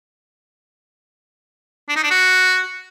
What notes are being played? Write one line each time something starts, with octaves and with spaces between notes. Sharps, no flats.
D4
D#4
D4
F#4